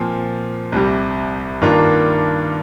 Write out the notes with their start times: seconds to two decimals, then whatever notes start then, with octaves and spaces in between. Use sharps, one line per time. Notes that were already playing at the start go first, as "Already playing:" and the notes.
Already playing: A#2 F3 C4
0.72 C2 C3 G3
1.62 G2 D#3 A#3 D4 F4